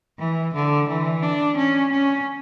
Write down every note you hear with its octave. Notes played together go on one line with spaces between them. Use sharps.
E3
D3
E3
D4
C#4
C#4